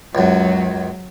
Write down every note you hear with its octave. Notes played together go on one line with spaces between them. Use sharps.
C#2 F#2 F#3